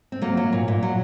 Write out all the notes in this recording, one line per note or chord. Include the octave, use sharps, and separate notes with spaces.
C4
F#3 A#3
F#3
A#2
A#2
F#3